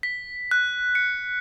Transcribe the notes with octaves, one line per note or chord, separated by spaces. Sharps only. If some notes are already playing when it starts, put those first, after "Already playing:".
B6
F#6
C#7